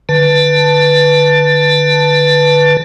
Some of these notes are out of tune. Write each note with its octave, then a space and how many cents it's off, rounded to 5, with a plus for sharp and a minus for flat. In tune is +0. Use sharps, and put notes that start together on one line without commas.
D3 +20 B4 +0 A5 +0